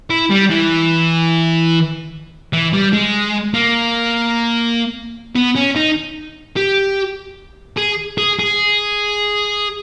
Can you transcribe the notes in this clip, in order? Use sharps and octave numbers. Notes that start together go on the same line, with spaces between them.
E4
G3
E3
E3
G3
G#3
A#3
B3
C#4
D#4
G4
G#4
G#4
G#4